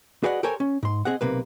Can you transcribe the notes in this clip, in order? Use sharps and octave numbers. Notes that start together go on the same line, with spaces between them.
F#4 G#4 B4 D5 D#5 F#5
G4 A4 A#4 C5 C#5 G#5
C#4
G#2 C6
C4 G#4 D#5 F#5
B1 C3 A#3 B4